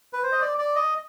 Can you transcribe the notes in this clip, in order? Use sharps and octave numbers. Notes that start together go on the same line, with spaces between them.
B4
C5
D#5
D5
D5
D#5